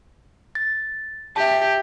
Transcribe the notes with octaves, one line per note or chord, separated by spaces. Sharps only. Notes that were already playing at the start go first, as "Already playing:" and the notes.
A6
G4 E5 A5